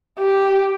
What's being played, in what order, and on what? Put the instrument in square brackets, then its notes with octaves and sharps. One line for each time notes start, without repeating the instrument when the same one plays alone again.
[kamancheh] G4